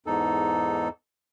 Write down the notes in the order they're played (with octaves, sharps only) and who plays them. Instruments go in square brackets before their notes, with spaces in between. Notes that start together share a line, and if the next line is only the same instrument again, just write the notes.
[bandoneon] E2 G#2 D#4 A4